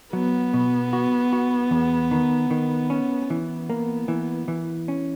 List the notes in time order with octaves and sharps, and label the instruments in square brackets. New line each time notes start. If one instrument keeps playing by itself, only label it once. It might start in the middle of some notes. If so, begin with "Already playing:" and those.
[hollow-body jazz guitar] F#3 [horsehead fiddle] B3
[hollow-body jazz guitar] B2
F#4
F#4
E2
D#3
D#3
C#4
[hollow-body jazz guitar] E3 [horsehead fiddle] B3
[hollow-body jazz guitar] A#3
E3
E3
C#4